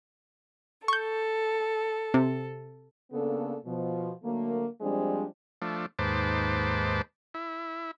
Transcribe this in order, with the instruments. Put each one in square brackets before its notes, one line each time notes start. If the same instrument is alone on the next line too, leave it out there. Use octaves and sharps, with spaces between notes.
[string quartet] A4 [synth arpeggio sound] C#6 G6
[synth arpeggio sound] C3
[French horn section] C#3 A#3 B3 D4 A4
B2 F3
D3 F#3 A3 A#3
F3 G3 G#3 C4 D4
[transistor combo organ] F3 A3 D4
D#2 G#2 B4 C5 A5 D6
E4